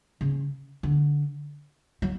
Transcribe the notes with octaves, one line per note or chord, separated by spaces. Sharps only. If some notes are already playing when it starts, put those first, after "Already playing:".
C#3
D3
F#3